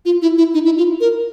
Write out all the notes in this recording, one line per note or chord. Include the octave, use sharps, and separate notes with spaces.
F4
E4
E4
D#4
E4
F4
A#4